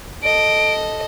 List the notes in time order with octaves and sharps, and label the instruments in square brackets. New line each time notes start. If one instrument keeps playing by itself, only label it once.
[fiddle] A4 D#5 [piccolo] D7